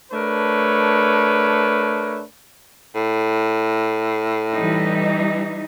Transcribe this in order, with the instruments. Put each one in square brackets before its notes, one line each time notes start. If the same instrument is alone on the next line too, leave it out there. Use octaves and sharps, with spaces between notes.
[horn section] A3 D4 A#4 B4 C#5
[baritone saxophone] A2
[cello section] E3 G3 D#4